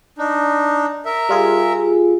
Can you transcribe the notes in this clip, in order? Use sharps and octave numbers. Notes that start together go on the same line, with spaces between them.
D4 D#4
A#4 E5
G3 F4 G#4